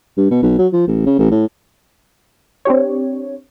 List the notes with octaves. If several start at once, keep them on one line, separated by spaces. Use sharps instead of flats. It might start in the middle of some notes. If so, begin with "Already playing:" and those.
G2
B2
B1
F#3
F3
A1
C#3
A1
A2
C4 D4 G4 C#5